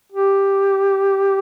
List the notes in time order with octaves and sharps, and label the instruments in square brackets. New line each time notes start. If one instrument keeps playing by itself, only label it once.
[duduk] G4